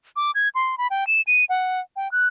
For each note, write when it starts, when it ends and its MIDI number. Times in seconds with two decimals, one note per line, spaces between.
0.16 0.31 86
0.35 0.49 92
0.55 0.75 84
0.78 0.87 83
0.90 1.07 79
1.07 1.21 100
1.27 1.45 99
1.49 1.80 78
1.96 2.11 79
2.11 2.28 90